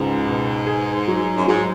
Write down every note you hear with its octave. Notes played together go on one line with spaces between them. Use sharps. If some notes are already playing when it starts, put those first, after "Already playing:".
Already playing: C#2 G#2
B2
G#4
F#3
F#2
G#2 F#3